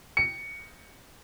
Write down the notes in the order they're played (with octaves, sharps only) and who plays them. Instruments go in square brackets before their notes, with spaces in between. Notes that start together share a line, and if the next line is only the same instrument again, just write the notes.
[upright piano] C#7